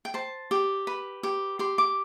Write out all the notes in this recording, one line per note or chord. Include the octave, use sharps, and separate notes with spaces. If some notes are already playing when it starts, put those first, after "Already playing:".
G5
C5 A5
G4
B4
G4
G4 C6
D6